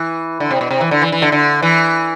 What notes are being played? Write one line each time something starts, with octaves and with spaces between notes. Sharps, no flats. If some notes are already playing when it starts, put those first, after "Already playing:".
Already playing: E3
D3
C3
B2
C3
E3
D3
E3
E3
D3
D3
E3